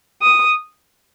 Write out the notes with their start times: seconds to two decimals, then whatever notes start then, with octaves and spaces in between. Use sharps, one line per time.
0.22 D#6